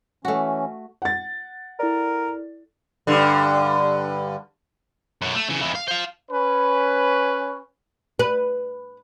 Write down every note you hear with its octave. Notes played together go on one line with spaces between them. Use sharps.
E3 A3 C#4 F#4
F#5 A6
E4 A4 A#4 D5
G2 D3
F#2 B2
A3
C#3 E3
F2 E3
F5
C5 F5
C#4 B4
B4